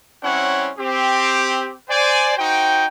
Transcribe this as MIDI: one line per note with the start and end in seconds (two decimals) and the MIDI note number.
0.23 0.71 55
0.23 0.71 60
0.23 0.71 61
0.23 0.71 64
0.23 0.71 73
0.23 0.71 78
0.79 1.76 60
0.79 1.76 67
1.89 2.35 72
1.89 2.35 74
1.89 2.35 80
2.37 2.87 63
2.37 2.87 66
2.37 2.87 72
2.37 2.87 79